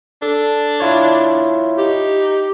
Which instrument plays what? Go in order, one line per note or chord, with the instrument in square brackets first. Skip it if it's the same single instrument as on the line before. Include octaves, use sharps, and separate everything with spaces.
[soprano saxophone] D4 [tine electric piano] A4
[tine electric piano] E4 F4 C#5
[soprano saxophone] D#4 [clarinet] G4